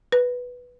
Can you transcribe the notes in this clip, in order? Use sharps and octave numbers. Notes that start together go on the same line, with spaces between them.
B4